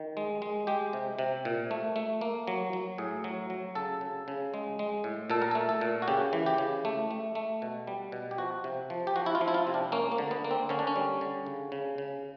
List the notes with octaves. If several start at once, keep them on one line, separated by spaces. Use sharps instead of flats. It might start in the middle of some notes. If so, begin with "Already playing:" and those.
Already playing: D#3
G#3
G#3
G#3 G4
C3
C3
A#2
A3
A3
A#3
F#3
F#3
A2 G#4
F#3
F#3
C#3 A4
C#3
C#3
G#3
G#3
A2
A#2 A4
A#4
A4
A3
A4
A#2
F#4
C#3 G4
E3
G4
C#3
A3
A3
A3
B2
G3
B2
G4
F3 F#4
C3
F3
G4
F3 F#4
E4
F4
F3
E4
F4
C3
D4
A#3 C#4
A#3
D3
B3
A#3
C4
D3 C#4
D4
C#4
G3
D3
C#3
C#3
C#3